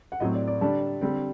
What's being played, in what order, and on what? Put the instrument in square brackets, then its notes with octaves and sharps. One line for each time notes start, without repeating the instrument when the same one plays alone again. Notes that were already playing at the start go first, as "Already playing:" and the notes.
[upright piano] F#5
A2 F#3 C4 D#5
D5
D5
D3 G3 D4 A5
D3 G3 C4